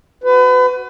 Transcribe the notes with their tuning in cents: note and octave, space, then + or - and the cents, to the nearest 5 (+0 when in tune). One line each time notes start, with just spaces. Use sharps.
F#4 +0 B4 +35